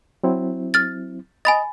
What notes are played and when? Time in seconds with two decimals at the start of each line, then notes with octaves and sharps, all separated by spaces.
0.23 F#3 C4 E4
0.74 F6 A6
1.45 D#5 G#5 B5 A6